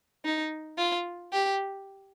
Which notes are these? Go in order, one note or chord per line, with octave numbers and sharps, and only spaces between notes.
D#4
F4
G4